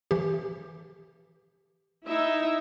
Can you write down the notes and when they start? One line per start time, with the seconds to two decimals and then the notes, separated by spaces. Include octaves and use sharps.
0.11 E3 G4
2.07 D#4 E4 E5